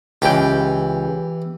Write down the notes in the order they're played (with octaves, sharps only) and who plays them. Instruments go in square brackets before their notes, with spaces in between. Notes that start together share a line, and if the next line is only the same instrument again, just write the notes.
[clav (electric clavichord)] C#2 G5 [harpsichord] E3 G4